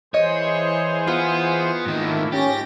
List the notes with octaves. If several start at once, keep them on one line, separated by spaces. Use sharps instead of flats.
E3 G#4 C5 C#5 D#5
B3 F4
G#2 D#3 A3 A#3 E4
G#2 C#4 G4 A6 A#6